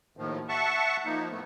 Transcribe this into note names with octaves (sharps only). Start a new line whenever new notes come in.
D#2 A2 D#3 F3
E5 F#5 A5 C#6
F3 A#3 D#4
A2 A3 B3